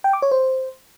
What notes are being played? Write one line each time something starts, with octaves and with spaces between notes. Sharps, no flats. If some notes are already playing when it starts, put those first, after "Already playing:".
G5
D6
C#5
C5